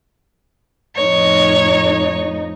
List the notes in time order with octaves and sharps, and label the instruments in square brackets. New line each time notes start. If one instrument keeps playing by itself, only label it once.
[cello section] F2 A2 D#4 [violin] C#5